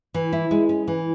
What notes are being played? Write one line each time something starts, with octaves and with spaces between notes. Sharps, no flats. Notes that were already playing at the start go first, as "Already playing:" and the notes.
E3
E4
G#3
C#4
E3